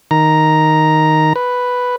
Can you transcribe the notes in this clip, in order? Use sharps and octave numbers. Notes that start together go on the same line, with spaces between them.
D#3 A#5
B4